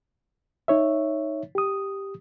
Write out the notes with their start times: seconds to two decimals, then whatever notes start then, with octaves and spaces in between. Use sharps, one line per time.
0.68 D#4 C#5 E5
1.55 G4 D#6